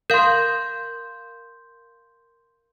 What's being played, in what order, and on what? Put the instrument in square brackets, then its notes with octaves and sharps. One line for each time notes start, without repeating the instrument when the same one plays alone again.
[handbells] A#4 F5 [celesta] C6 G6